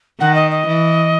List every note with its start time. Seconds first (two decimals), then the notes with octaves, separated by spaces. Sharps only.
0.20 D#3 F#5
0.34 D#5
0.51 D#5
0.67 E3